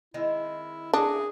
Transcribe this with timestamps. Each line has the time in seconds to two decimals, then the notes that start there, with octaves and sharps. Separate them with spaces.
0.14 D#3 G#3 C4 E4
0.93 D4 E4 F#4 G#4 F#5